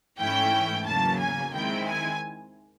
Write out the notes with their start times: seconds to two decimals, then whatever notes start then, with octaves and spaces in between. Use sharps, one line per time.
0.19 G#2 E3 A3 C#4 E4 G5
0.86 E2 C#3 F#3 A#3 A5
1.19 G#5
1.53 D#3 G#3 C4 E4 G5
1.86 G#5